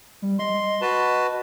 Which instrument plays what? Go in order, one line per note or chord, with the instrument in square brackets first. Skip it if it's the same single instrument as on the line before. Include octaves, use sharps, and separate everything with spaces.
[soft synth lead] G3
[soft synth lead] D#5 [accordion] C6
[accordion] F#4 B4 A5